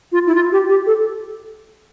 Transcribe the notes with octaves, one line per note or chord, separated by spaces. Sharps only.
F4
E4
F4
G4
G4
A4